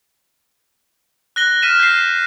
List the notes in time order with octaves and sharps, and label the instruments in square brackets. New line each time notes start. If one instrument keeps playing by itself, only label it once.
[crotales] F#6 A#6 G7
F6 B6 D#7 E7
G6 C7